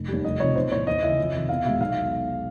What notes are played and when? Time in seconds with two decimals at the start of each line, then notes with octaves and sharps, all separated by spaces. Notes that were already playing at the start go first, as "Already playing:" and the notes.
Already playing: F1
0.08 D#2 D#3 G3
0.24 F1 D#5
0.40 F2 C3 C#5
0.55 B1 C5
0.71 A2 E3 C#5
0.87 D#2 D#5
1.03 C#3 E3 E5
1.18 F2
1.34 C3 D#3
1.49 E2 F5
1.65 B2 G#3 E5
1.80 B1 F5